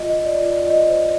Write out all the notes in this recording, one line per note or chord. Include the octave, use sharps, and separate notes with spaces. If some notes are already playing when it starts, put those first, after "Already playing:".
Already playing: F4 D#5
F4
D5
F4
F4 D#5
C5